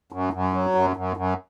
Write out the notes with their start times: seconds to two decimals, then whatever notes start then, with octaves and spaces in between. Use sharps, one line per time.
0.12 F#2
0.33 F#2
0.54 F#3
0.75 F#2
0.96 F#2
1.17 F#2